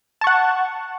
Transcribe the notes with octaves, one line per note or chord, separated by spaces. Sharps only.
F#5 A5 C#6